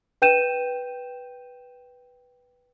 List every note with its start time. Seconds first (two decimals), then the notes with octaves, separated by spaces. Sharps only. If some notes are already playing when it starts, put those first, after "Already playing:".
0.22 B4 G5 G6 D#7 E7